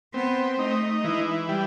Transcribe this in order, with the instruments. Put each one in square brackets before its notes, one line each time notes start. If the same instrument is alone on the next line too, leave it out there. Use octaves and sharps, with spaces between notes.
[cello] B3 [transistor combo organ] C4
[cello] A3 [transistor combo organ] D#4
[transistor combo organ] E3 [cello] G#3
[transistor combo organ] G3